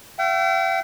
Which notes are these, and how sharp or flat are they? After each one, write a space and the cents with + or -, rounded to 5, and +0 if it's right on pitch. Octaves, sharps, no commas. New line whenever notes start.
E5 +45 G5 -40